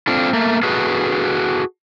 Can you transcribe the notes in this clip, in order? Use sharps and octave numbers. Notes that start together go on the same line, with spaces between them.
C4 D4 F4 A4
A3 A#3
F#4 G#4 A4 B4